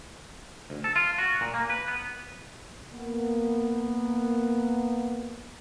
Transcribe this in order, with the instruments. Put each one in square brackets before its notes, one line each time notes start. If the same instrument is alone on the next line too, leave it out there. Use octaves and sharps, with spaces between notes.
[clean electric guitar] D2
A4
F4
F#4
A#2
A#3
B4
B3
[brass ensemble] A#3 B3